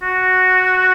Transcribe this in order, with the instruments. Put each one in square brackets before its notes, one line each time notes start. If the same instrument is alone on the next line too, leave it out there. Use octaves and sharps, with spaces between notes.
[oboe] F#4